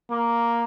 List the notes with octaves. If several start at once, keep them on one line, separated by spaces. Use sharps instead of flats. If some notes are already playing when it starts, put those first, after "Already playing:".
A#3